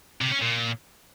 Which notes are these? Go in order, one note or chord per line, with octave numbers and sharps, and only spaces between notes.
C3
C#4
A#2